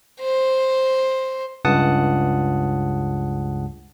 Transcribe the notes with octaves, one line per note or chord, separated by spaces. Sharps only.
C5
C#2 G2 F#5 A5 D#6